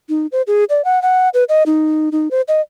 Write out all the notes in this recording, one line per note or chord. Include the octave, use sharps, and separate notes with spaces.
D#4
C5
G#4
D5
F#5
F#5
B4
D#5
D#4
D#4
C5
D#5